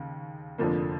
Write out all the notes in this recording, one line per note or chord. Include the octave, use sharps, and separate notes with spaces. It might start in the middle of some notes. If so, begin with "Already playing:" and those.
Already playing: D#2 C#3
F1 F2 D3 F3 A#3